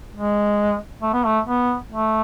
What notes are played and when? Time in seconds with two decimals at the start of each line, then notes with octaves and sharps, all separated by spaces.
0.15 G#3
1.02 A3
1.13 B3
1.25 A3
1.45 B3
1.89 A3